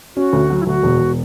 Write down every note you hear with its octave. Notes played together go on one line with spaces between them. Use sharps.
C#4 F#4
D2
F#3
E4
D2 F#4
E1
E1